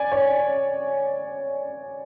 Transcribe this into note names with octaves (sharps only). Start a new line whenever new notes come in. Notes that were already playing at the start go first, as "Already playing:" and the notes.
Already playing: D5 G#5
C#5